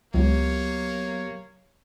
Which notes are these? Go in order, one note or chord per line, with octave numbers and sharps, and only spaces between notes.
C#2 F#3 A#3 B3 G4 C#5